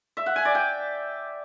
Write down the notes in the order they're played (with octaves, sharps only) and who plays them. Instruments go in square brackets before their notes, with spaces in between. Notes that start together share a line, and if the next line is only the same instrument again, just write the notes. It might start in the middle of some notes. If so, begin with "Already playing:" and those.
[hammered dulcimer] E5
F#5
G#5
D5
G5